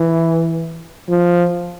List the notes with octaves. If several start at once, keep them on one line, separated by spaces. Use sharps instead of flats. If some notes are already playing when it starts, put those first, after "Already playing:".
Already playing: E3
F3